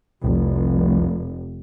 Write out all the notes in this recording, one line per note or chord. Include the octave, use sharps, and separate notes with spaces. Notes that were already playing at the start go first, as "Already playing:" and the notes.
F1 C2